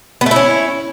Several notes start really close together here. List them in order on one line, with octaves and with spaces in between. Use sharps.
B3 A3 E4 C#4